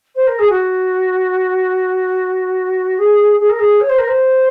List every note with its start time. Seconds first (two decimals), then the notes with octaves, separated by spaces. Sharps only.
0.16 C5
0.27 A#4
0.39 G#4
0.50 F#4
2.99 G#4
3.39 G#4
3.49 A#4
3.59 G#4
3.81 C#5
3.89 C5
3.99 A#4
4.08 C5